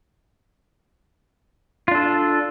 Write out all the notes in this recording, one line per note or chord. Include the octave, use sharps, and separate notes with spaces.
D4 F4 A4